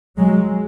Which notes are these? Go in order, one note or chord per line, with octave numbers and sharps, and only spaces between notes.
F#3 G#3